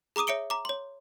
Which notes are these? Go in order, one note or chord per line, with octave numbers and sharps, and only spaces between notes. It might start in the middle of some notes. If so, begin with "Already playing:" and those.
G#4 A#5 D6 D#6 D#7
C#5 E5 C#7 D7 G7
A#5 D6
C#5 C6